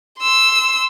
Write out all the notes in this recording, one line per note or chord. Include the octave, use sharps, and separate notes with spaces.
C6 E6